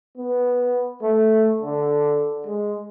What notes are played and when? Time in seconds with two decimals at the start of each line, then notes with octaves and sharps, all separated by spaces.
0.17 B3
1.02 A3
1.61 D3
2.46 G#3